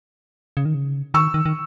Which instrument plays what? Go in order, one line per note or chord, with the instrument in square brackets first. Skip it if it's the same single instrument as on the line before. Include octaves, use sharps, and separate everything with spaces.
[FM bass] C#3
D#3
C#3
[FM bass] D#3 [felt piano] C#6 E6
[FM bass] D#3
D#3